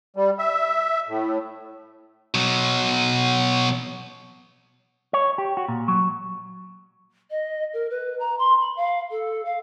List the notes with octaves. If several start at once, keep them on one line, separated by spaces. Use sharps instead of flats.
G3
E5
A2
B2 F#3
C#5
G4
F#4
A#2
F#3
D#5
A#4
B4
A#5
C6
B5
F5
A4
F5